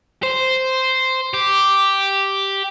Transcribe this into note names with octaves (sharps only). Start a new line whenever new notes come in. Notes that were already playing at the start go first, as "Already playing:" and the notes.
C5
G4